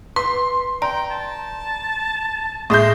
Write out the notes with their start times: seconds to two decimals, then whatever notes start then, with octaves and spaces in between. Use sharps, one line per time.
0.16 B4 C6
0.82 D5 G5 A#5
1.11 A5
2.70 A2 G#3 E5 C6 D#6 G6 A#6